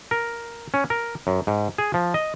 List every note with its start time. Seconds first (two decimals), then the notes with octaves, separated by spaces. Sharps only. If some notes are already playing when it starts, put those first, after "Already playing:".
0.11 A#4
0.74 C#4
0.90 A#4
1.27 F#2
1.47 G#2
1.78 G#4
1.94 F3
2.14 D#5